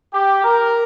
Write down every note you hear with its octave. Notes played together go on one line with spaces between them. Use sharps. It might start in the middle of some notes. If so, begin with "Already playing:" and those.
G4
A#4